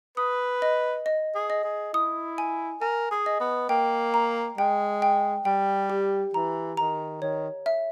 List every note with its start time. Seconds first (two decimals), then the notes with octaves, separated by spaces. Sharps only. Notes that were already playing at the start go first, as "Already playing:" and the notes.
0.17 B4 D#6
0.62 D#5
1.06 D#5
1.35 G#4
1.50 D#5
1.64 G#4
1.93 E4 D#6
2.38 G#5
2.81 A#4 G#5
3.11 G#4
3.26 D#5
3.40 B3
3.69 A#3 G5
4.14 A#5
4.58 G#3 G5
5.02 G5
5.45 G3 G5
5.90 G4
6.34 E3 A#5
6.77 D#3 A#5
7.22 D#3 C#5
7.66 E5